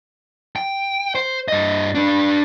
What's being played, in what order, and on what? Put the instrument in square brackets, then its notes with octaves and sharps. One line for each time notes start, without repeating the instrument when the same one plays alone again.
[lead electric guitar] G5
C5
G2 D#5
D4 B4